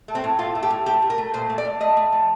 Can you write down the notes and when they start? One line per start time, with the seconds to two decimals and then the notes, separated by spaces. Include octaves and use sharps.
0.08 A3
0.15 C4
0.24 A2
0.39 A3 F4
0.55 A3
0.63 G4
0.70 A2
0.86 A3 G4
1.02 A3
1.10 A#4
1.18 A3
1.34 A#2 C5
1.49 A3
1.58 D5
1.65 A3
1.81 A3 D#5
1.97 A3
2.12 F3